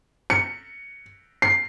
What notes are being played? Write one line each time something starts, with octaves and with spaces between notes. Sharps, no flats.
C#7
C7